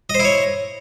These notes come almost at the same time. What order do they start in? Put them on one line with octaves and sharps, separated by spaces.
D#5 C5 E4 C#5